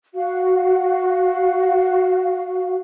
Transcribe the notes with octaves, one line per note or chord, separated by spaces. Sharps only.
F#4 F5